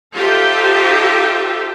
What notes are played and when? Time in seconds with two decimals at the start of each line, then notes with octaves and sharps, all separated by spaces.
0.15 D#4 F4 G4 A4 C5 E5